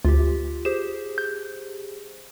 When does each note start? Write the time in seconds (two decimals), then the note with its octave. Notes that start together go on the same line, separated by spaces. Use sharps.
0.05 D2 F4 G4
0.65 G4 G#4 C5 E7
1.18 G6